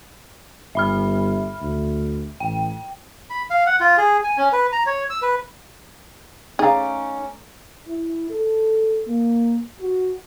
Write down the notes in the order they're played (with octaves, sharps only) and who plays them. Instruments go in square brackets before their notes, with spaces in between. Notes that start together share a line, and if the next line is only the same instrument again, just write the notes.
[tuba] G1 [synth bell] E5 B5 F6
[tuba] D2
[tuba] A1 [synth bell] G5
[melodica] B5
F5
F#5
F4
G#4
G#5
C#4
B4
A#5
C#5
E6
B4
[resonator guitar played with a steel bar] A3 D5 A#5 [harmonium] C#4 [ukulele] D#4 F5 [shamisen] G#4
[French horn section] E4
A4
A#3
F#4